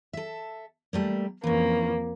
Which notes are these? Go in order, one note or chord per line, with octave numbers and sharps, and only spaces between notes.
A4 E5
G3 A3 A#3
F2 E3 A#3 C#4